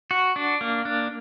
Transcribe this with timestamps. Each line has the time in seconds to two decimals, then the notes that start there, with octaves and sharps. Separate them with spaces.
0.11 F#4
0.36 D4
0.61 A#3
0.85 D4